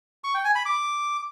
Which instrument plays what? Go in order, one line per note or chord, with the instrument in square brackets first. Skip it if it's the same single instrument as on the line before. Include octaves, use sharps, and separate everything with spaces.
[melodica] C#6
G5
G#5
B5
D6